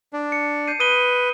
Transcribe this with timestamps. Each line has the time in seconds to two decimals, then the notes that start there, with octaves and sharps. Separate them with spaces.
0.13 D4
0.32 C#7
0.68 G6 C7 D#7
0.80 B4 D#6 D#7 G7